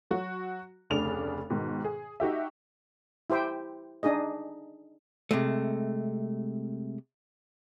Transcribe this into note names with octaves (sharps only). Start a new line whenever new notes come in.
F#3 F#4
F1 D2 C#3 D4 F7
G#2 B2 D#3
G#4
D#4 F#4 G4 E5
E4 G4 C5 E5 G5
D4 D#4 G#4 D#5
C3 G#3 A3